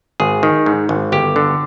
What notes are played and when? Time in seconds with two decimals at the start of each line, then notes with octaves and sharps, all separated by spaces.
0.20 G#1 G#4
0.43 D#3
0.66 G#2
0.89 G#1
1.12 G1 G4
1.36 D3